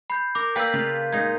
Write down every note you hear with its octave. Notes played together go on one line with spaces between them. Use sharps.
B5 G6 C7
A#4 D6
A#3 B4 D5 G5 E6 G6 B6
C#3 F4
A#2 G#3 D#4 G#6